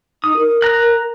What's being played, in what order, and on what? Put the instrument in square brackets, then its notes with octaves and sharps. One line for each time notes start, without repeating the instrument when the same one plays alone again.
[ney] D#4 [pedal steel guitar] D#6
[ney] A#4
[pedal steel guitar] A#5 F#6